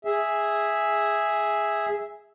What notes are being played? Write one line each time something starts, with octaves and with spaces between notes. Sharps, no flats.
G#4 E5